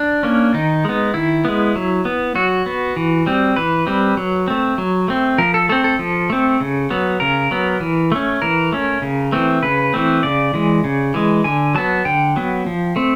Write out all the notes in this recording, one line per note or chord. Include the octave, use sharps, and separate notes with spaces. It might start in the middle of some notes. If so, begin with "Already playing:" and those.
Already playing: D4
A#3 C#4
D#3 D#4
G#3 B3
D#3 E4
G#3 B3
F#3
B3
F#3 F#4
B3
E3
G3 C4
E3 B4
G3 C4
F#3
A3 C4
F#3
A3 C4
F3 A#4
A4
A3 C4 A4
A4
F3
A3 C4
C#3
F#3 B3
C#3 A#4
F#3 B3
E3
A3 C#4
E3 A#4
A3 C#4
C#3
E3 A3 C4
C#3 B4
E3 A3 C4
C#3 D5
E3 G#3
C#3
E3 G#3
D3 G#5
F#3 B3 A5
D3 G5
F#3 B3
F3
A3 C4